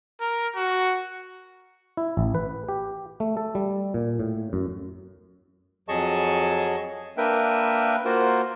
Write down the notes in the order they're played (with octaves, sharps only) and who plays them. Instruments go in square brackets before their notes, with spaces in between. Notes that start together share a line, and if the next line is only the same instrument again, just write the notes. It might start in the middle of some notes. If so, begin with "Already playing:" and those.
[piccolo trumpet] A#4
F#4
[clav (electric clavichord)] E4
A1
B4
G4
A3
A4
G3
A#2
A2
F#2
[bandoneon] F2 F#3 G#4 D#5 A5 C#6
A#3 D4 A#4 B4 E5 G5
A#3 F4 F#4 A#4 C5